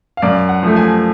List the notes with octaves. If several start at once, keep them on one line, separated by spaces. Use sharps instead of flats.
F5
F#2 D5
F#5
F3 A3
G#5